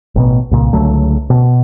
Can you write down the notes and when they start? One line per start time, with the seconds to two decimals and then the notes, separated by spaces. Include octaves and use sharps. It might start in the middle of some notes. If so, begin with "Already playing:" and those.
0.16 A1 B2 B3
0.51 C2 A#2 C#3
0.73 C#2 D3 F#3 A3
1.30 B2